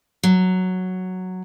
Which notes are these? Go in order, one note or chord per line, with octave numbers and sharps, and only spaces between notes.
F#3